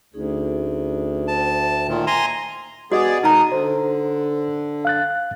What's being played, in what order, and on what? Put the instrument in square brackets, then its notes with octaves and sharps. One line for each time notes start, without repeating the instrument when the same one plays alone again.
[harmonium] D2 [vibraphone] C#4 D#4 G#4
[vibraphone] C5 E5 G5 [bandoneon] A5
[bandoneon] A#2 D#3
G#5 A#5 C6
[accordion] B3 G#4 D5 [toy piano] F#4 D#5
[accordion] B2 A#4 D#6 [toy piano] D#4 A#5
[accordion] D3 [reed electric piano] C5
[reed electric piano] F5 F#6 A6